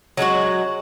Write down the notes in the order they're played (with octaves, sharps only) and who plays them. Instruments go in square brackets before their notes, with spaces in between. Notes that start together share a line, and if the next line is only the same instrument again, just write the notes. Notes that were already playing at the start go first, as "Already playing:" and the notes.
[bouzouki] F#3 G#3 C#4 F#4